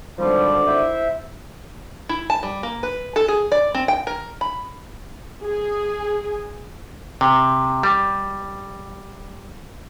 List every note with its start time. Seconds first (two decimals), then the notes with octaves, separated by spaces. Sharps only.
0.18 G#1 D3 F3 G3 D5
0.67 E4 C5 E5
2.09 E4
2.30 A5
2.43 G3
2.63 A#3
2.83 B4
3.16 A4
3.28 G#4
3.52 D5
3.75 C4
3.88 G5
4.07 A#4
4.41 B5
5.45 G#4
7.21 C3
7.83 G3